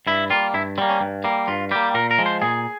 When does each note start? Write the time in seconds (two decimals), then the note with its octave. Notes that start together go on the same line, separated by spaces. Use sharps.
0.07 G2 E4
0.30 G3 A#3 F4
0.54 G2 E4
0.78 G3 A#3 C4
0.89 C#4
1.01 G2
1.24 G3 A#3
1.48 G2 F4
1.71 G3 A#3 G4
1.94 A#2 A#4
2.11 A#4
2.18 F3 G#3
2.26 C5
2.42 A#2 G#4